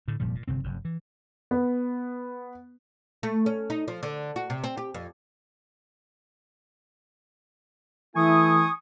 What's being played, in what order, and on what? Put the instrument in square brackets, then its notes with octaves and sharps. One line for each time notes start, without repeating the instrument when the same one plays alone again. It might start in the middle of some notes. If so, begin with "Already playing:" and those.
[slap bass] A2 D3
F1 A#2 F3 G3
A#2
G1 C3 C4
F1 F#2
E3
[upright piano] B3
[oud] A3
C#4
D#4
F3
D3
F#4
C3
C4
G4
F2
[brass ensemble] E3 A3 E4 [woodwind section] G#5 C#6 D#6